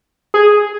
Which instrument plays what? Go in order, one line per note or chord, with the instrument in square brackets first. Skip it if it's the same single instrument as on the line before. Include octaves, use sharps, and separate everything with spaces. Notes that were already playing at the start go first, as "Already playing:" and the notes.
[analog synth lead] G#4